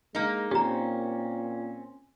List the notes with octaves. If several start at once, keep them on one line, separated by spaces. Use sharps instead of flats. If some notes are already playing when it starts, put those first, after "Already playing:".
G#3 A#3 D#4
A#2 C4 C#4 G4 A#5